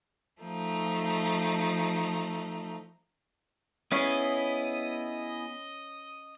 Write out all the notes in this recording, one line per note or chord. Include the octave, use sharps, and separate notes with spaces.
F3 A3 D#4
B3 C#4 E4 G#4 D#5